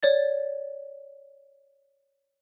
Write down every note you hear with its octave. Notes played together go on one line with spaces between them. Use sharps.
C#5 D5 A6